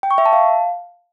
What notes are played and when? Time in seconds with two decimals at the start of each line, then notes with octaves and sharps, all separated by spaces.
0.03 G5
0.11 C#6
0.18 E5
0.25 A5
0.33 F5